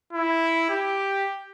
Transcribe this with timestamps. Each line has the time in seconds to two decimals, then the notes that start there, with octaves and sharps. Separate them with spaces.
0.13 E4
0.70 G4